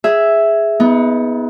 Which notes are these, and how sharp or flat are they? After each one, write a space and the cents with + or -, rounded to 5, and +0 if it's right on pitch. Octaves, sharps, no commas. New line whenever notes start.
G#4 +0 E5 +0
B3 +0 D#4 +35